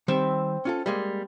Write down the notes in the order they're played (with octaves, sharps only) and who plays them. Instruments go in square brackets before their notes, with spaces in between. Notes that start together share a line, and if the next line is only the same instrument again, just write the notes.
[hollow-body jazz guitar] D#3 G3 [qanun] C4 E5
[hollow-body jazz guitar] C#4 F4 A4
G3 G#3 A#3